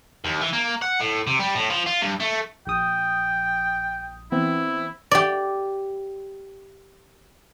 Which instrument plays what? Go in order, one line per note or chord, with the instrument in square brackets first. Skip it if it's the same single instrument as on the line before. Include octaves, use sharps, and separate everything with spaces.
[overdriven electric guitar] D#2
E3
A#3
F#5
A2
C3
G3
A2
F3
F4
G2
A3
[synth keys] A#1 D#6 [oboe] G5
[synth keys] E3 B3 C4 [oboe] E4
[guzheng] G4 D5